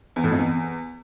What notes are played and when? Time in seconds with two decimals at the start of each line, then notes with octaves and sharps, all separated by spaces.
0.16 E2
0.24 A2
0.31 F2
0.39 E2